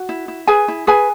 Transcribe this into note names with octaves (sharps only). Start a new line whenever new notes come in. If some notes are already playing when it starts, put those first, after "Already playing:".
Already playing: F#4
E4
E4
G#4 B4 G#5
E4
G#4 B4 G#5